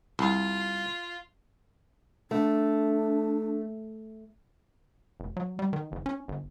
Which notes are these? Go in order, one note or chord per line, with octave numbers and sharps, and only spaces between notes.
C2 F4
A3 D4
F1
F#3
G3
D#3
F#1
C#4
G1